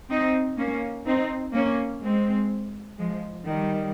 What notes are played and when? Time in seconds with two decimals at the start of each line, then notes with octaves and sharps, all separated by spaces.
0.10 C4 D#4
0.58 A#3 C#4
1.06 C4 D#4
1.54 A#3 C#4
2.02 G#3 C4
2.98 F3 G#3
3.46 D#3 G3